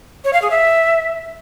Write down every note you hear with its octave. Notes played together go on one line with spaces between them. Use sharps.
C#5
F5
G#4
E5